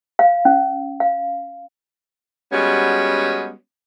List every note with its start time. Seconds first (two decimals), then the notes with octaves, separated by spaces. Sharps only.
0.19 F5
0.45 C#4
1.00 F5
2.53 G3 G#3 B3 C#4 F#4